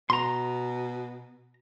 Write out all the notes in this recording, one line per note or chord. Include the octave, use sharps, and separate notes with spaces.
B2 A#5 C6